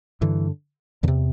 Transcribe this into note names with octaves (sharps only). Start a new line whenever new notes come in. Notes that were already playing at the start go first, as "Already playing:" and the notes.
G2 D3 E3
E2 C3 D3